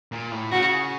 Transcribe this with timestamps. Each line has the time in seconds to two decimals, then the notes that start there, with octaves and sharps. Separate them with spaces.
0.12 A#2
0.31 A2
0.52 C#3 F#4